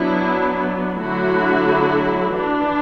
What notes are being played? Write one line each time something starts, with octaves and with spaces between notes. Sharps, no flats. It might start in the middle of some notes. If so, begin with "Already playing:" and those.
Already playing: F#3 B3 D4 E4
D3 F#3 A3 E4 F#4
E3 D4